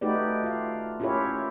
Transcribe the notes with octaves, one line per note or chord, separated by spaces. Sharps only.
A3 D#4 F#4 G4 B4 D5
F4 F5
C#4 E4 F4 G4 A#4 C#5